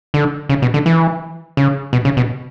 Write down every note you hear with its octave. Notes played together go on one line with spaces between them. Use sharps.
D3
C#3
B2
D3
E3
C#3
B2
C#3
B2